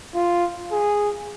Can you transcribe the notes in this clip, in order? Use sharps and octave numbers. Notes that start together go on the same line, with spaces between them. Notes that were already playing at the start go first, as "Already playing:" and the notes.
F4
G#4